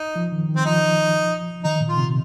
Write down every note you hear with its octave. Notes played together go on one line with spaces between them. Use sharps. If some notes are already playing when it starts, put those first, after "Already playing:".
Already playing: D#4
F3
D#3
D#3
C4
F3 D#4
D#3 D#4
A#2
F4
C3